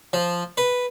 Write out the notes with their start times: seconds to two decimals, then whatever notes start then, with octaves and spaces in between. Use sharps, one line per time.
0.13 F3
0.57 B4